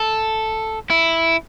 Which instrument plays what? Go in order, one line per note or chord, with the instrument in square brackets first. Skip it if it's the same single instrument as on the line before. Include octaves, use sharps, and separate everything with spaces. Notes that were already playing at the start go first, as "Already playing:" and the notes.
Already playing: [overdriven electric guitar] A4
E4